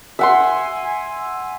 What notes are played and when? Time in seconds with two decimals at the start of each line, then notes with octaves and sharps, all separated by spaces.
0.19 E5 F#5 G#5 C6